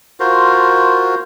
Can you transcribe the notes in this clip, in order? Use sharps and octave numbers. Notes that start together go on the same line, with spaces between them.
F4 F#4 A#4 C5